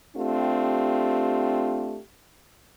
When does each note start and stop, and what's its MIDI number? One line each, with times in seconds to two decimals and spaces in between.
0.16 2.00 57
0.16 2.00 60
0.16 2.00 62
0.16 2.00 65
0.16 2.00 67